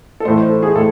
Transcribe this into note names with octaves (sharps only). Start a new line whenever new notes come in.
A4
A2 E3 A3 C5
C5
A4
G#4
A2 A4